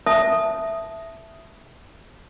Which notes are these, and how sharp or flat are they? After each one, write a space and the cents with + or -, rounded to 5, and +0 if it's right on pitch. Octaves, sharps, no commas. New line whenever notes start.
E5 +0 A5 -5 D#6 +0